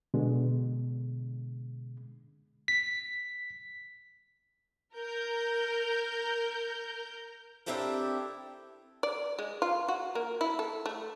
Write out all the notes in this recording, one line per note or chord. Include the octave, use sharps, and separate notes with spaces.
B2 D3 G#3
B6
A#4 G6
C4 D4 E4 G4 A4 A#4
D5
G#3
F4
F#4
A#3
E4
A4
A3